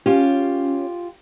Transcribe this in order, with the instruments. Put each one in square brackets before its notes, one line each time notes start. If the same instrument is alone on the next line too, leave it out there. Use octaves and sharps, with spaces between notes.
[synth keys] C#4 [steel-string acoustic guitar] F4 G4